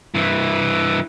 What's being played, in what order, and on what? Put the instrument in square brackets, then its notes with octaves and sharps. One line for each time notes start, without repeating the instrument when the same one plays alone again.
[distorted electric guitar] G2 E3